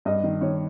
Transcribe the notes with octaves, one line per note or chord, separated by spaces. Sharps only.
G2 D#5
D#3
D#3 C#5